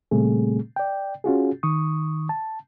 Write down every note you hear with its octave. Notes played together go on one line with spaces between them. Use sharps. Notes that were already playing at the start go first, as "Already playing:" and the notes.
A#2 C#3 G3 A3 C4 G#4
D5 G5
C#4 F4 F#4 G#4
D#3 C#6 D#6
A5